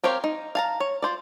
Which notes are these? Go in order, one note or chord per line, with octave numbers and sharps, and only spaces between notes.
C4 G4 A#4 C#5 F5
D#4
F5 A5 A#5
C#5
F4 C5 D5